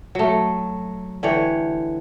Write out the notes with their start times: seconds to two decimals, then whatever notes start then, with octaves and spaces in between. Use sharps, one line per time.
0.15 F#3 A3
1.23 D3 E3 G4 C#5